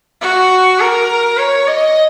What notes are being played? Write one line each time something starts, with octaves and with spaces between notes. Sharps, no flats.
F#4
A#4
C#5
D#5